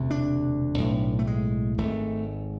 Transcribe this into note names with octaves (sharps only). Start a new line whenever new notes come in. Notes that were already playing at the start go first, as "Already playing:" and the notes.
Already playing: E1 D2 C3
D4
B1 A2
A3
G#3
G#1 G#2 A3